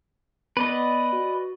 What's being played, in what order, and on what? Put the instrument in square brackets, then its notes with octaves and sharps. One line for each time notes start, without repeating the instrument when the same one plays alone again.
[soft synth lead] B3 [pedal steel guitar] B4 D5 D#5
[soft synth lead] F#4